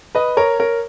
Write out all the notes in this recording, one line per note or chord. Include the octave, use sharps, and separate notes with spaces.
B4 D#5
A#4 C#5
A#4 C#5